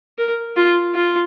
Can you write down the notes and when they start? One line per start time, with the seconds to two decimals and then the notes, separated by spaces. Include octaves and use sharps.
0.18 A#4
0.56 F4
0.94 F4